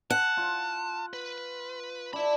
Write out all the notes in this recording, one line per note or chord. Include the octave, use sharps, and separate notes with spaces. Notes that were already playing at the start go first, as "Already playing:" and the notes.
F#5 A5
F4
B4
D4 E5 B5